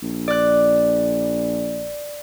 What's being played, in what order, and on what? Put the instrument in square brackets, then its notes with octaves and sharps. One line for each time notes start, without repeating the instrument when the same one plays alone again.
[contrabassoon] A#1
[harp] D5 F#6